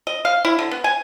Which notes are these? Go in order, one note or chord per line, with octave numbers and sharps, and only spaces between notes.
D#5
F5
E4
D3
B3
G#5